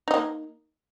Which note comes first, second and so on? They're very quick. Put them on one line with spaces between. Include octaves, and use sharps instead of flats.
D#4 D#5 A#3